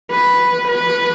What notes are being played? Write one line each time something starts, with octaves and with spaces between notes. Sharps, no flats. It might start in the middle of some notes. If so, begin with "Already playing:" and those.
B4
B4